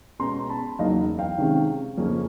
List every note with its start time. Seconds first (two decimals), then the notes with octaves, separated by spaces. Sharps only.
0.19 B2 G#3 C#4 A#5 C6
0.49 A5 B5
0.79 E2 C#3 F#3 A#3 D#4 D#5 F5
1.19 F5 G5
1.38 C3 D#3 G#3 C#4
1.97 F2 C#3 F3 A#3 C#4